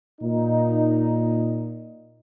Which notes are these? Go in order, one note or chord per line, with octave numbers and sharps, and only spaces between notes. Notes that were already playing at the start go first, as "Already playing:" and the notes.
A#2 D#4